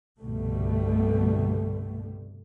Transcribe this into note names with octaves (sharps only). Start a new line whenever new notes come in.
C2 G2 B2 D3 G3 A3